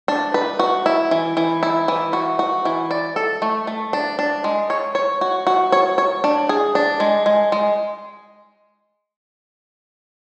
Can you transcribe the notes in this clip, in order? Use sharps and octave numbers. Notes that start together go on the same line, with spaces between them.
D4
B4
F#4
E4
E3
E3
E4
E3
F#4
F#4
E3
D5
A4
A3
A3
D4
D4
G#3
C#5
C#5
F#4
F#4
C#5
C#5
D4
G#4
D4
G#3
G#3
G#3